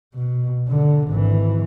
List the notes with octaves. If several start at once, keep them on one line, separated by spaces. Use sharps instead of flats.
B2
D3
G#1 E3